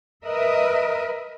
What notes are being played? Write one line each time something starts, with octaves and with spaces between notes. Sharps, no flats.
A#4 B4 D#5 E5